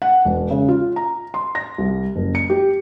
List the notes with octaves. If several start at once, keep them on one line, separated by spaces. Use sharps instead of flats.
F#5
E1
C#3
F4
A#5
C6
A#6
C2
F#1
C#7
G4